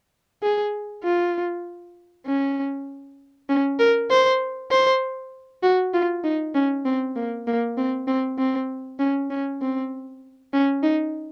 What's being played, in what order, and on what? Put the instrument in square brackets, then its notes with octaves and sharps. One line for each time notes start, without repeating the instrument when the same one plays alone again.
[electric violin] G#4
F4
C#4
C#4
A#4
C5
C5
F#4
F4
D#4
C#4
C4
A#3
A#3
C4
C4
C4
C#4
C#4
C4
C#4
D#4